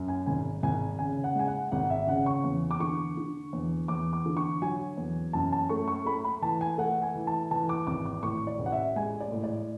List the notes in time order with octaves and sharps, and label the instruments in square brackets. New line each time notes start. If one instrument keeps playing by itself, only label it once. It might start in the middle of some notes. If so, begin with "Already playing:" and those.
Already playing: [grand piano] F#2
G#5
G#1 G#5
G#1 G#5
C#3 G#5
F#5
G#3 G#5
F#5
G#1 F#5
E5
C#3 F#5
C#6
E2
D6
D3 C#6
D3
E2
E2 D6
D6
D3
C#6
F#3 G#5
E2
F#2 A5
A5
A3 C#6
C#6
A3 B5
B5
E3 A5
G#5
A3 F#5
G#5
E3
A5
E3 A5
D6
G#1 D6
D6
A2 C#6
D5
A1
F#5
E5
G#3 G#5
D5
A2
D5